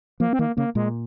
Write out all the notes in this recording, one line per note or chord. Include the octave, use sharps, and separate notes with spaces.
F3 A#3
C4
D#3 A#3
C#3 A#3
A#2 G#3